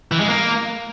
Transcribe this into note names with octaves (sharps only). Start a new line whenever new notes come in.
E3
G#3
A#3